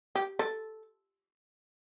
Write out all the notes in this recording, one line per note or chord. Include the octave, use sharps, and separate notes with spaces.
G4
A4